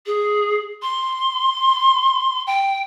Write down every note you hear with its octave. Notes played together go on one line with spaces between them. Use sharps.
G#4
C6
G5